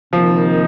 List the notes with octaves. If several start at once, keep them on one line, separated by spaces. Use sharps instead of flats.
C3 D#3 F3 A#3 D#4